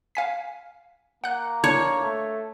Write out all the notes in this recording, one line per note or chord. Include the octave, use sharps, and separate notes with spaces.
F5 G#5 B6
A#3 F#5 F#6
D4 C#5
A3